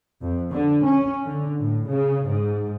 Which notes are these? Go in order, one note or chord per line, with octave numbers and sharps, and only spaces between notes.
F2
D3
C#4
D3
A2
C#3
G#2